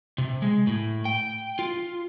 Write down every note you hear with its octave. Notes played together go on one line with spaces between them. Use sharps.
C3
G#3
A2
G5
F4